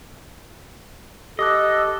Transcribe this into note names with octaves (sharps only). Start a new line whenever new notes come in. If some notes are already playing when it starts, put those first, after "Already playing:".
G4 A4 D#5 D6 F#6